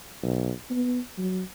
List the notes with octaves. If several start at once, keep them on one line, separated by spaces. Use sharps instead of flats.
B1
B3
F#3